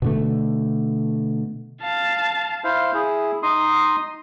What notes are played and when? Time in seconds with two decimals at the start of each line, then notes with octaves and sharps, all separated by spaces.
0.02 B2 D3 A3
1.82 F5 A5
2.64 E4 C5 F5
2.94 E4 G#4
3.43 D#4 C6 D#6